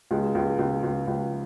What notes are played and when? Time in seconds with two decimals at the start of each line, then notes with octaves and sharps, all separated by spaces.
0.11 C#2 G#3
0.35 C#2
0.59 C#2
0.84 C#2
1.08 C#2